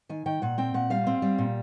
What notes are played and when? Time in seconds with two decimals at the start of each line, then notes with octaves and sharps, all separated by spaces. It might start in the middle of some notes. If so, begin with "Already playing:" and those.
0.09 D#3 G#5
0.26 D#3 G5
0.42 A#2 F#5
0.58 C4 G5
0.74 A#2 F#5
0.90 G3 F5
1.07 C4
1.22 G3
1.38 A#2